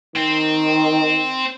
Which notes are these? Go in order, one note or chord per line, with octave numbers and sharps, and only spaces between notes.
D#3 C4